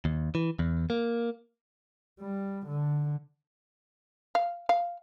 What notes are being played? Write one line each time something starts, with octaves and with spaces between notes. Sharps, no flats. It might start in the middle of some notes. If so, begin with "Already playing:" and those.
D#2
E3
E2
A#3
G3
D3
F5
F5